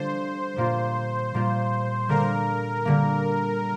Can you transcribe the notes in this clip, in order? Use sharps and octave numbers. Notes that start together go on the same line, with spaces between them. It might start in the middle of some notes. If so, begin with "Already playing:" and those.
Already playing: D3 G3 D4 F4 C5
A#2 G3 A#3 F4
A#2 G3 A#3 F4
D3 G3 A#3 A#4
D3 G3 A#3